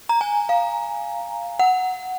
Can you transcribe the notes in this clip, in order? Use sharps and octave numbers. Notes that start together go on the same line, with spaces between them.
A#5
G#5
F5
F#5